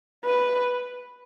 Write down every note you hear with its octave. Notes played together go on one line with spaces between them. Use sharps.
B4